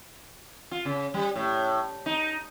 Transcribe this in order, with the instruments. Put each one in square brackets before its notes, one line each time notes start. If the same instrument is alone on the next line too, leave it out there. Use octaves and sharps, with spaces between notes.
[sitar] F4
C#3
G3
A2
D#4